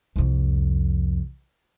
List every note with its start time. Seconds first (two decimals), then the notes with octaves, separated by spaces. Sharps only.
0.16 C2 F2